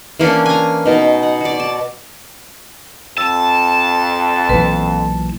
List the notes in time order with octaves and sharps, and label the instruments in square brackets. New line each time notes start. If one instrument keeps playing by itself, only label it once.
[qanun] E3 A#3 C#4 D4
G#5 A#5
B2 D#4
F#5
F#4 D5
A5
[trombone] F2 [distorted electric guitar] A5 [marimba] E6
[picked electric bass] B1 A#2 E3 [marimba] B4